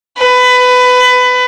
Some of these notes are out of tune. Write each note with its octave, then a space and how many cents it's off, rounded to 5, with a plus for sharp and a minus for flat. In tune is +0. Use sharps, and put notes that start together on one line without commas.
B4 +20